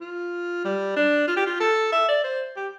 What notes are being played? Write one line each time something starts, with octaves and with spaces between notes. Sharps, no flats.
F4
G3
D4
F4
G4
F4
A4
E5
D5
C5
G4